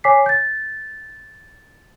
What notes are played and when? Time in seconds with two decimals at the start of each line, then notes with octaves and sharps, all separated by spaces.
0.04 C#5 G#5 D6 B6 C7
0.26 G6 A6